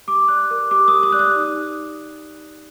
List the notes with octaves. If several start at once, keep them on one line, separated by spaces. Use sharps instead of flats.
G4 D6
D5 F#6
A#4
G4 D6
D#6
G4
D#6
D5 F#6
D#6
D#4